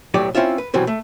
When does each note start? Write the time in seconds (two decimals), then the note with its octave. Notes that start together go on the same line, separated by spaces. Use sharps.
0.14 B1 A2 F#3 G4 D5
0.35 C4 C#4 E4 F4 E5
0.58 B4
0.74 B2 E3 F#3 G3 C4
0.87 A3